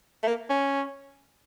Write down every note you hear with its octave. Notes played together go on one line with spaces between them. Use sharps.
A3
A#3
C#4